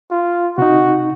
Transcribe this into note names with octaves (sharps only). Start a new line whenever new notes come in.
F4
C3 D#4 F#4